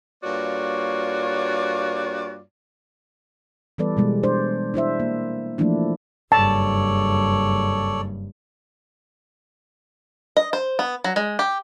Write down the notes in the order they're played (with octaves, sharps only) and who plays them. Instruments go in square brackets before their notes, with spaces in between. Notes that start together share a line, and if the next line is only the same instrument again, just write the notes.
[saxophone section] G2 A#3 F4 F#4 C#5 D5
[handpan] E3 G3 B3 A4 B4 D5
B2 G3 G#3
D4 C5 D5
D4 E4 C5 E5
A#3
E3 F3 A3 A#3 D4 E4
[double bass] F#1 G2 [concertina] A4 C#5 D5 [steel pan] A5
[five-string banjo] D#5
C5
B3
F#3
G#3
G4